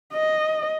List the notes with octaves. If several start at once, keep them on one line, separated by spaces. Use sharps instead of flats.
D#5